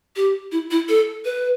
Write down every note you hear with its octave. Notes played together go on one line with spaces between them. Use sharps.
G4
E4
E4
A4
B4